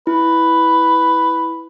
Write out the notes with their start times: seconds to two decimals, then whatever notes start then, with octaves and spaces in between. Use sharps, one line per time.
0.07 E4 B4